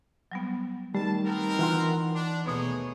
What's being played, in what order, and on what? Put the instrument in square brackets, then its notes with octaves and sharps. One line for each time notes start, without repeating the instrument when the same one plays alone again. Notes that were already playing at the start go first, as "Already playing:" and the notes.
[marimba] F#3 G3 B3
[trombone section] D#3 [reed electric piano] G3 [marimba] A3 [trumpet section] A5
[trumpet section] B3 C4 A#4
[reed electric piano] E3 F#5 C6 [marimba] F4 G5
[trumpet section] D4
[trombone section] D#2 A3 B4 [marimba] B2 B3 [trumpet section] D#4 G#4 C#5